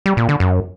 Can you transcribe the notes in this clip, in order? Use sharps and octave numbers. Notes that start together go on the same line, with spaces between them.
G3
A#2
D3
F#2